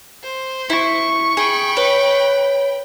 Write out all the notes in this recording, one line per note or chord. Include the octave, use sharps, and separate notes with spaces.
C5
E4 C#6
G#4 G5 B5
B4 C#5